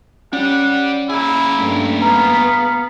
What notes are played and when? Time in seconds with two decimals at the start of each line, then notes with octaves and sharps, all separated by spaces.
0.33 C#4 G4 D5 F#5
1.10 A#3 E4 G#4
1.57 G2 A3
2.02 B3 F5 A#5